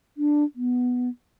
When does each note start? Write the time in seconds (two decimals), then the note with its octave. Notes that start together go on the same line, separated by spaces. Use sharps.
0.17 D4
0.55 B3